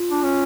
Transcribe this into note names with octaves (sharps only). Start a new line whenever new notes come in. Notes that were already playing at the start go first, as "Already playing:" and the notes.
Already playing: F4
D4
C#4